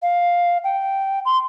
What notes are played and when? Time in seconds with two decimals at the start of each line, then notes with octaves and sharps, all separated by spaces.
0.02 F5
0.64 G5
1.25 C6